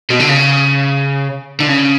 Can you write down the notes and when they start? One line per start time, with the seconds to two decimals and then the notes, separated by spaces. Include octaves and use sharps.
0.10 B2
0.20 D3
0.29 C#3
1.60 D3
1.68 C#3